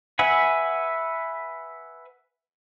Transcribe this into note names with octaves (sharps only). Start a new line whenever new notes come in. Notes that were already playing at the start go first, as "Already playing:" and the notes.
B4 E5 F#5 G#5 B5